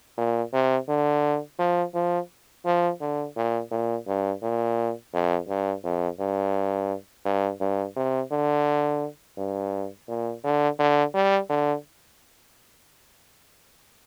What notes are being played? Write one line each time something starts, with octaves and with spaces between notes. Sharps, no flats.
A#2
C3
D3
F3
F3
F3
D3
A#2
A#2
G2
A#2
F2
G2
F2
G2
G2
G2
C3
D3
G2
A#2
D3
D3
G3
D3